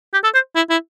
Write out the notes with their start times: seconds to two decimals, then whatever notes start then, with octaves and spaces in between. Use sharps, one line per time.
0.13 G4
0.24 A4
0.34 C5
0.56 E4
0.70 E4